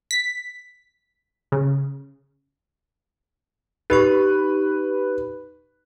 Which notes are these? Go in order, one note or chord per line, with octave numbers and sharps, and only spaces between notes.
B6
C#3
D#4 G4 B4 C#6